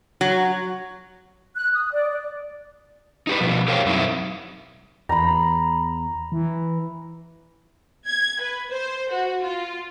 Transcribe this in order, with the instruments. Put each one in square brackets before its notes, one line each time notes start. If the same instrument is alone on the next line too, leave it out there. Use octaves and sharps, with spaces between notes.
[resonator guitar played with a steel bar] F#3
[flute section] F#6
D#6
D5
D5
[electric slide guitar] D#4 G4 B4
B2 F3
G4 A#4 C5 C#5 F5 G5
F#2 B2 F#3 C4 D#4 E4
[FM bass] E2 [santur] A#5 B5
[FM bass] E3
[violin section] G#6
B4
C5
F#4
F4